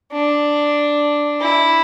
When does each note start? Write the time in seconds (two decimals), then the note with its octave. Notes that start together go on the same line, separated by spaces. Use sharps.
0.12 D4
1.41 E4